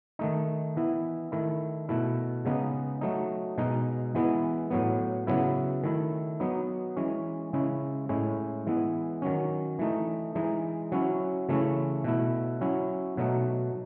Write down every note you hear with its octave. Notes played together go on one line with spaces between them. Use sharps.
D#3 A3 D#4
E3 B3 E4
D#3 A3 E4
B2 A3 E4
C#3 G#3 B3 D#4
F#3 A3 D#4
B2 G#3 D#4
E3 G#3 B3 E4
A2 F#3 B3
C#3 F#3 B3 E4
D#3 A3 E4
F#3 B3 D#4
E3 G#3 C#4
C#3 G#3 C#4 E4
A2 G#3 C#4 E4
E3 G#3 B3 E4
D#3 F#3 C#4
E3 A3 D#4
E3 G#3 D#4
F#3 C#4 E4
C#3 E3 A3 C#4 E4
B2 A3 E4
F#3 C#4 E4
B2 F#3 A3 D#4